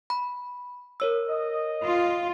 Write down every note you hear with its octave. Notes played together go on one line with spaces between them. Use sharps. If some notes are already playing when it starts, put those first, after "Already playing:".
B5
A#4 C#5 E6
D#5
F4